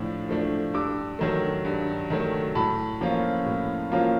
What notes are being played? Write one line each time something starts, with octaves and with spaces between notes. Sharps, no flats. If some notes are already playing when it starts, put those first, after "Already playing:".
Already playing: A2 F3 D4
F3 A3 D4
G2 D6 E6
D#3 F#3 A3
G2
D#3 F#3 A3
A2 A5 B5
F3 A#3 C#4 F4
A2
F3 A#3 C#4 F4